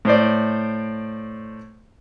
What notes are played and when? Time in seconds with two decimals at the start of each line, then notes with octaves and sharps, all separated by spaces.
0.05 A2 C5 D5